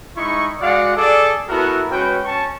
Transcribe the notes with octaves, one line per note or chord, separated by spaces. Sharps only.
G#3 D#4 E4 C#6
G#3 F#4 D5 F5 F#5
G#4 A4 D5
B3 E4 F#4 A4 A#4
G#3 C#4 F#4 B4 G5
C#4 A5 C#6